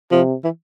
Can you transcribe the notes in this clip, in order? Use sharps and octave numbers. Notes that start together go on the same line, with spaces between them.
C3 F3
E3